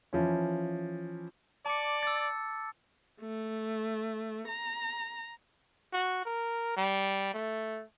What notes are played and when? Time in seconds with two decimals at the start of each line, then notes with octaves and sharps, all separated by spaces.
0.13 E3 F3 C#4
1.66 D5 A5 D6 C#7
2.03 E6 A6
3.21 A3
4.48 A#5
5.93 F#4
6.25 A#4
6.76 G3
7.34 A3